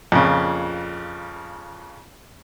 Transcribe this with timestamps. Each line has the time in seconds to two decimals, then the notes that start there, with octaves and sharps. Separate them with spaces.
0.12 F2 A#2 C#3